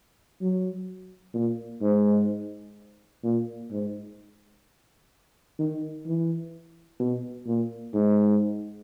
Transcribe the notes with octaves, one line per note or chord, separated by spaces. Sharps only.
F#3
A#2
G#2
A#2
G#2
D#3
E3
B2
A#2
G#2